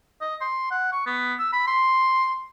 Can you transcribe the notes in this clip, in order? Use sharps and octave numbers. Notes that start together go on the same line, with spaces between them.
D#5
C6
F#5
C#6
B3
E6
B5
C6